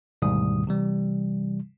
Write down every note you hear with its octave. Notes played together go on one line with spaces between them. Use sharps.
D2 G#2 B2 D#3 G3 D#6
C3 E3 G3